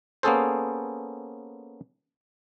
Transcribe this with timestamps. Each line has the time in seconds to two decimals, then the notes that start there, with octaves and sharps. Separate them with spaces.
0.23 A#3 B3 C#4 G#4 A4 C5